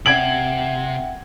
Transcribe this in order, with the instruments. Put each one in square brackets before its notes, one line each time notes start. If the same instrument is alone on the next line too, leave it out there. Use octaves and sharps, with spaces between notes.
[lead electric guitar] C3 [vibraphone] E5 F#5 G5 [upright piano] G#6 D7 F#7